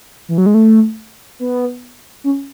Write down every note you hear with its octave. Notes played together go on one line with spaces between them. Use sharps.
E3
F#3
G#3
A3
B3
C#4